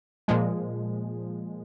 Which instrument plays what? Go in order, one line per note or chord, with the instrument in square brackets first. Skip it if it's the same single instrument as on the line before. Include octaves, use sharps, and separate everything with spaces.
[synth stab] A#2 F3 G#3